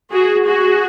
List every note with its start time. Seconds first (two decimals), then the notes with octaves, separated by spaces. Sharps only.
0.12 F#4 G#4
0.46 F#4 G#4